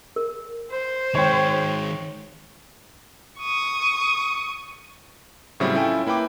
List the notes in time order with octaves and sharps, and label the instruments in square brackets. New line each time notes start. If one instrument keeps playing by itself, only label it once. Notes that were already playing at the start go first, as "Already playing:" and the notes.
[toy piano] A#4
[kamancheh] C5
[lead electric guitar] D#3 G#3 [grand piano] C#5 G5
[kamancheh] C#6 D#6
[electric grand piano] A2 C#3 F#3 G3 C4 E4
C#4 E4 F4 A4 G5 G#5
A#3 E4 B4 G5 D6